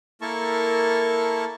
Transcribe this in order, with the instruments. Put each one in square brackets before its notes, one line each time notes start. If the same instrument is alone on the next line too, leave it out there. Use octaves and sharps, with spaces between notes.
[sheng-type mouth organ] A#3 E4 A4 A#4 A5 C#6